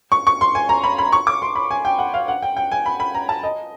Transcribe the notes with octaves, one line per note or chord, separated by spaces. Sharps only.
C#6
C#6
C6
G#5
A#5
B5
B5
C#6
D6
C6
B5
G#5
G5
F#5
F5
F#5
G5
G5
G#5
B5
B5
A#5
A5
D#5